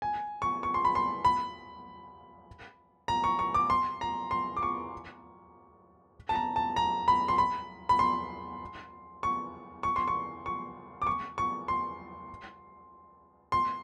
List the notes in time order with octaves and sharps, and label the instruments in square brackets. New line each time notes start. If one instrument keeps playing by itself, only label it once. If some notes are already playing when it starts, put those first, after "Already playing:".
[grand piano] G#5
C#6
C#6
C6
B5
C6
B5
A#5
C#6
C#6
D6
C6
A#5
C6
D6
C#6
A5
A#5
A5
A#5
B5
C6
B5
B5
C6
C#6
C#6
C6
C#6
C#6
D6
C#6
C#6
C6
C6